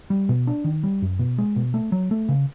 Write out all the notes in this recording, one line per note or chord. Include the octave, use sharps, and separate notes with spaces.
G3
B2
D4
D#3
G3
F#2
B2
G#3
B2
A3
F#3
A3
C#3